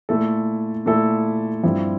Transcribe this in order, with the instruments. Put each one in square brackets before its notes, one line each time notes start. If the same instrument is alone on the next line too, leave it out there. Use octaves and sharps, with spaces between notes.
[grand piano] A#2 A3 E4 A4
A#2 A3 E4 A4
G2 F3 C4 E4